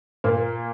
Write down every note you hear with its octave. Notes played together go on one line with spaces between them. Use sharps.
A#2 A#3